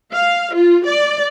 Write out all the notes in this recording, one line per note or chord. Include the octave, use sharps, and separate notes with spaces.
F5
F4
D5